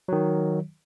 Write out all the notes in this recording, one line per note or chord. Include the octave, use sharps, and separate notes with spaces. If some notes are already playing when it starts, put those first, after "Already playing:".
D#3 F#3